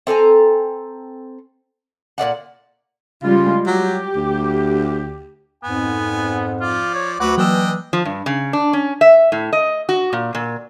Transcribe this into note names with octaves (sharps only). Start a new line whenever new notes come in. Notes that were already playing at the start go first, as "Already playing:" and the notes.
C4 A4 G#5 A#5
A#2 C#3 D5 F#5
C#3 G3 G#3 F4
F#3 G4
D2
F2 G#2 B3 G#5
F3 F4 D5
C#5
D2 F#3 F#4 B4 F#5 D6
E3 F#3 A#3 D4 D#5 G5 E6
F3
G2
C#3
D4
C#4
E5
A2
D#5
F#4
A#2
A#2